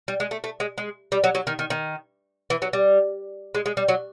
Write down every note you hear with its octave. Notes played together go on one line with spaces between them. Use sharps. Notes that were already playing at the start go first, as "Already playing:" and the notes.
G3
G#3
A3
A3
G#3
G#3
G3
F#3
F#3
D#3
D#3
D#3
E3
F#3
G3
G#3
G#3
G3
F#3